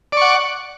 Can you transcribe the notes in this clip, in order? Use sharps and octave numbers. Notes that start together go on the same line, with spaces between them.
D5 F#5 C#6